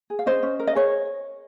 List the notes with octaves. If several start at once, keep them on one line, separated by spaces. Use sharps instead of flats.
G#4
F5
C#4 C5 D#5
C#4
A#4
D#5
G#4 C#5